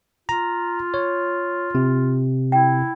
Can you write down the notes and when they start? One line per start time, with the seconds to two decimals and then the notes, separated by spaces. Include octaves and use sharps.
0.29 F4 A#5
0.94 C#5
1.75 C3
2.52 E4 G5